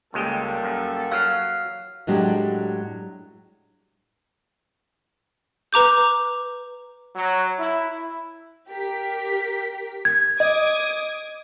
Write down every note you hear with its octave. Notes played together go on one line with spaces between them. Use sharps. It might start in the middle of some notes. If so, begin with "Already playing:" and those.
C#2 G3 G#3 A#3 A4 G5
F#2
F#3 F5 F6 C7
A2 F#3 G#3 D4 G4
B4 A#5 D6 G6
F#3
E4
G4 A#4 B6
G#6
D#5 D6 D#6 G#6